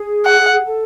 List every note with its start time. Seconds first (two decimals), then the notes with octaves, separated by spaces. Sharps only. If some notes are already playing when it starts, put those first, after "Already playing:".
Already playing: G#4
0.26 F#5
0.65 A4